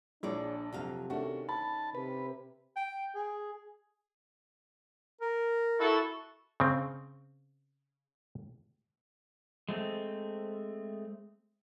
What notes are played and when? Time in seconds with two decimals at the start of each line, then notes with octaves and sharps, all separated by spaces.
0.23 A#1 D4 G#4 C#5 D5
0.73 F2 C3 F#3 F5
1.10 D#3 A3 C#4 D4 F#4
1.49 A5 B5
1.95 C3 B4
2.76 G5
3.15 G#4
5.21 A#4
5.80 E4 F#4 A4
6.60 C#3 C4
9.69 G#3 A3 C4